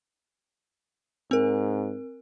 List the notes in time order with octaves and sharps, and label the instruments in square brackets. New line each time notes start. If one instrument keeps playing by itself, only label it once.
[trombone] G#2 [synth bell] C4 A#4